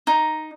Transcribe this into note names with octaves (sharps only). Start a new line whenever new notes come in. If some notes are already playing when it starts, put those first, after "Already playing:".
D#4